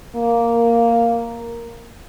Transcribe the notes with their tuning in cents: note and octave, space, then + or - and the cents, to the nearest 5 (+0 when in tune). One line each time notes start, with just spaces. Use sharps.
A#3 +0